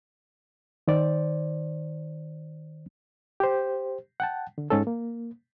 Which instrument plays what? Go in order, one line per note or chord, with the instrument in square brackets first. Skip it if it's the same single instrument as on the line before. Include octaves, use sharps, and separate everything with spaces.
[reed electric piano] D#3 C5 D5
G4 C5
F#5 G5 A5
D3
G#2 C#4 A4
A#3